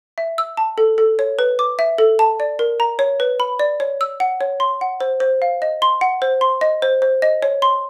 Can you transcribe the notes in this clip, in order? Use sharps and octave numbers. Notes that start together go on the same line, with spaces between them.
E5
E6
A5
A4
A4
C#5
B4
D6
E5
A4
A5
D5
A#4
A#5
C#5
B4
B5
D5
C#5
E6
F#5
C#5
C6
F#5
C5
C5
F5
D#5
C6
F#5
C5
C6
D#5
C5
C5
D#5
C#5
C6